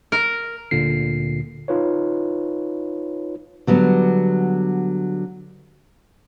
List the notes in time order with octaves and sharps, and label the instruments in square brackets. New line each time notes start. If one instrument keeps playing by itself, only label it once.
[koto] A#4
[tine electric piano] D2 A#2 D3 C7
D#4 F4 B4 C#5
[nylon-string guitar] D3 F#3 G3 B3